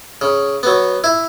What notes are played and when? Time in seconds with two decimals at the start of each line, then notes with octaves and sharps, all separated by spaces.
0.21 C#3
0.63 F#3 B3
1.04 E4